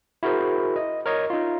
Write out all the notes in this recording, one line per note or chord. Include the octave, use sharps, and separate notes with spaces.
E4 F#4 G#4 A#4 C5
D#5
A#4 C#5 D#5
D#4 F4